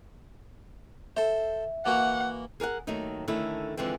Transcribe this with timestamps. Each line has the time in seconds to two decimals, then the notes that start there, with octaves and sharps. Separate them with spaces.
1.17 A4 C5 E5
1.86 E3 A#3 F#4 F#5
2.60 G#4 A#4 C#5 F#5
2.87 D#2 D#3 F#3 A3 D#4
3.28 D3 D#3 A3 C#4 E4
3.77 D3 E3 F3 G#3 C4